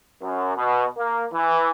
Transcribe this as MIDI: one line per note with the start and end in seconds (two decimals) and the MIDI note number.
0.22 0.52 42
0.55 0.86 47
0.98 1.25 58
1.33 1.71 52